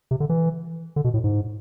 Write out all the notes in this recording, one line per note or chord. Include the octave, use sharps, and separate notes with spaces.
C3
D3
E3
D3
B2
A2
G#2